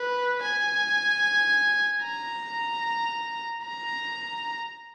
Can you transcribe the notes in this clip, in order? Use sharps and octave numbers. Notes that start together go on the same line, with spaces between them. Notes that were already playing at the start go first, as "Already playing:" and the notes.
Already playing: B4
G#5
A#5
A#5